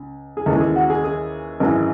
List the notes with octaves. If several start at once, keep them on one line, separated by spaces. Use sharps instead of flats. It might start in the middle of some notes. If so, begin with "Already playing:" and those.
Already playing: C#2
G#4
D#2 C#3 E3 G#3 A4
G#4
F#4
G#4
G#4
G#1 F#2 E3 G#3